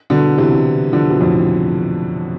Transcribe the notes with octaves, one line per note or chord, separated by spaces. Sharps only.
B2 D3
C3 E3
D3 F3
B2
F2 A2